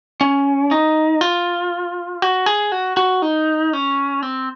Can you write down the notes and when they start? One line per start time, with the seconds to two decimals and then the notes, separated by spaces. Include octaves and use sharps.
0.21 C#4
0.71 D#4
1.21 F4
2.22 F#4
2.46 G#4
2.72 F#4
2.97 F#4
3.22 D#4
3.73 C#4
4.22 C4